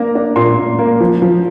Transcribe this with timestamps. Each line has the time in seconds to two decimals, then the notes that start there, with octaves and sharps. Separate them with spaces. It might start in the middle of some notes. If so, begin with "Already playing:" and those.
Already playing: A#3 D4 A#5
0.15 D4
0.36 A#2 C6
0.57 A#2
0.79 A#3
1.00 F3
1.22 F3